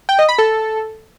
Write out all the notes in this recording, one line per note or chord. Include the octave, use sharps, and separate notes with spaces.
G5
D#5
B5
A4